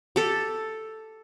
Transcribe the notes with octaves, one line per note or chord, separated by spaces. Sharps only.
G4 A4